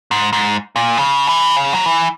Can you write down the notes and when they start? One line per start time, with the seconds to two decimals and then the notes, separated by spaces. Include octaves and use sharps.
0.11 G#2
0.33 G#2
0.76 A#2
0.97 C#3
1.27 E3
1.56 C#3
1.73 F#3
1.86 E3